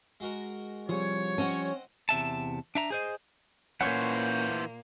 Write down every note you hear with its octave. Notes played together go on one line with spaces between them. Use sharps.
G#3 F#4 A#4
C2 F3 G3 G#4 C#5
C4 C#4 D#5 F#5
E2 C3 E5 A5
D4 E5 A#5
G#4 C5 D#5
A#2 E3 A#3 C#4 C5 C#5 F#5 C#6